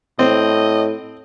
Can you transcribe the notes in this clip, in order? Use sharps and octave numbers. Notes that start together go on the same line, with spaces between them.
A2 C4 D#5